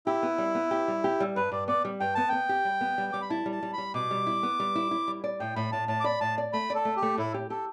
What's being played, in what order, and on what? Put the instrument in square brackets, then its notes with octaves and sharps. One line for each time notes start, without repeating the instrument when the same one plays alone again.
[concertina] E4 [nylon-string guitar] G4
[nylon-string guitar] B3
G3
B3
G4
G3
G4
G3
[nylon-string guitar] G2 [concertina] B4
[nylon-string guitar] G2 [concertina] D5
[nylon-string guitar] B3 [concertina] D5
[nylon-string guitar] G3
[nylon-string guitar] G2 [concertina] G5
[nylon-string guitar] B3 [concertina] A5
[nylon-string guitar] B3 [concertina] G5
[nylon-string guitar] G4
G3
B3
G3
[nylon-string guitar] G3 [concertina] D6
[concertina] B5
[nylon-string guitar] E4 [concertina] A5
[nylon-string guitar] G3
[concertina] A5
[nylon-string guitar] G3
[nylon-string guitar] G3 [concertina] B5
[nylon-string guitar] B2 [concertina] D6
[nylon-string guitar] G3
E4
B3
G3
E4
E4
G3
D5
[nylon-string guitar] A2 [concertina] G5
[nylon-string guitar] A2 [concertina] B5
[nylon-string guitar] A2 [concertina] A5
[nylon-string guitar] A2 [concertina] A5
[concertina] D6
[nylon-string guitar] D5 [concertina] B5
[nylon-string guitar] A2 [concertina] A5
[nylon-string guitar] D5
[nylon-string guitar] A3 [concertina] B5
[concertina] A4 [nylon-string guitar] D5
[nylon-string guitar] A3
[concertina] G4
[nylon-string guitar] A3
[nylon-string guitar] A2 [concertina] E4
[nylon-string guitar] G4
[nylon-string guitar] G4 [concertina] A4